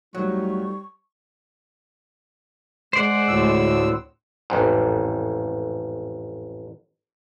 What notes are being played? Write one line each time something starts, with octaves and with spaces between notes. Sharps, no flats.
F2 F#3 G3 A3 D#4 C#6
G#3 C5 D5 F#5
D2 A2 E6
A1 F2 G#2